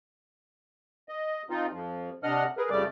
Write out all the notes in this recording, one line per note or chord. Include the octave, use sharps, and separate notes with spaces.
D#5
F3 C4 D#4 F4
F2 F3
C3 D4 D#5 F#5 F6
G#4 A#4 B4
F2 C#3 G3 A3 D5 D6